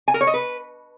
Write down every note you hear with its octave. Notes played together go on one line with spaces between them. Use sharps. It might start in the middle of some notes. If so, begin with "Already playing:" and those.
G#5
A#4
C#5
D#5
B4